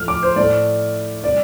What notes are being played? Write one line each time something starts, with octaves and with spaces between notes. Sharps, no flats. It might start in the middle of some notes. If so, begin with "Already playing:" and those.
Already playing: A2 F3 A3 F6
D6
C5
A2 A3 D5
C3 G3 D5